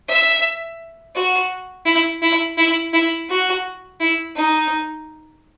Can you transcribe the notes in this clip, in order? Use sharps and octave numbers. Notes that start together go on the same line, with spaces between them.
E5
F#4
E4
E4
E4
E4
F#4
E4
D#4